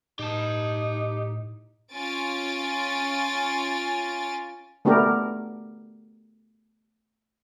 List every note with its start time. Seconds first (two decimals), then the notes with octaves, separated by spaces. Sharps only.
0.19 A2 D#4 G4 A5
1.93 C#4 F4 G#5 A6 D7
4.85 A3 B3 D4 G4 A#4